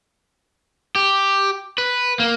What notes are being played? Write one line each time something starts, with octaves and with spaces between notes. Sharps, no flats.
G4
B4
A#3